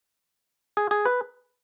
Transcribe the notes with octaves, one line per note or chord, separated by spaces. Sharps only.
G#4
G#4
B4